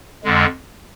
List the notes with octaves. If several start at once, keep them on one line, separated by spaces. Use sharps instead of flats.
F2 D3 G#3